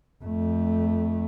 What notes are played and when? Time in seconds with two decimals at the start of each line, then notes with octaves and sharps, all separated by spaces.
0.24 F2 A3